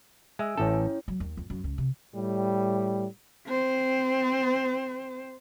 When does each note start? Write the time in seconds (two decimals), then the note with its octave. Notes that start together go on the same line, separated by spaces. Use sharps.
0.39 G#3 E5 G#5 E6
0.57 A1 C#4 E4 A4 C#5
1.08 F#3
1.20 D#2
1.37 F2
1.50 F#2
1.64 C#2
1.78 C3
2.15 A2 G3
3.47 C4 C5